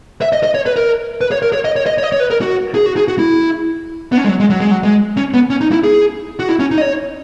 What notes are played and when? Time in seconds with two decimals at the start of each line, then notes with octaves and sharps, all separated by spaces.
0.22 E5
0.33 D#5
0.43 D#5
0.55 C#5
0.66 B4
0.76 A#4
1.21 B4
1.32 C#5
1.42 A#4
1.53 C#5
1.65 D#5
1.76 C#5
1.86 D#5
1.98 C#5
2.03 D#5
2.12 C#5
2.20 B4
2.31 A#4
2.41 F#4
2.75 G#4
2.86 F#4
2.97 G#4
3.08 F#4
3.19 E4
4.12 B3
4.18 C#4
4.25 G#3
4.28 F#3
4.40 G#3
4.50 F#3
4.60 G#3
4.71 F#3
4.84 G#3
5.17 C#4
5.34 B3
5.50 C#4
5.61 D#4
5.72 E4
5.84 G#4
6.39 F#4
6.49 E4
6.59 C#4
6.71 D#4
6.78 D#5
6.81 C#5